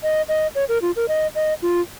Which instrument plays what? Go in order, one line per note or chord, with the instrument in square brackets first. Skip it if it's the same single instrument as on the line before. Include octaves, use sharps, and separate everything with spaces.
[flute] D#5
D#5
C#5
A#4
F4
A#4
D#5
D#5
F4